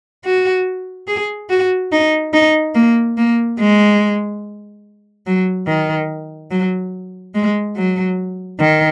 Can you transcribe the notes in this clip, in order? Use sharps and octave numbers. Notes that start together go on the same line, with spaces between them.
F#4
G#4
F#4
D#4
D#4
A#3
A#3
G#3
F#3
D#3
F#3
G#3
F#3
D#3